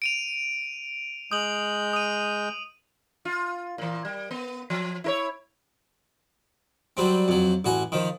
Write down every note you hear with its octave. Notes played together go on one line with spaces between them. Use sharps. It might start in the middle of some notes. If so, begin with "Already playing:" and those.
D7 D#7 F7
G#3 D#6 G6 F#7
D#6 D#7
F4
A#2 E3
G3
B3
F3
E4 A#4 C#5
F#3 G3 C4
F2 F#3
A1 F#4 G#5
D#3 F3